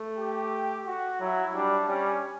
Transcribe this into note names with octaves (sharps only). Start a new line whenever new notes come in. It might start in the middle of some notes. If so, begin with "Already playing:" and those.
Already playing: A3
G4
F#4
F#3 E4
G3 D4
G3 C#4